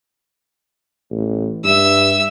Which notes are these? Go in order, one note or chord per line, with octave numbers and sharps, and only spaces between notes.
A1
G2 E5 E6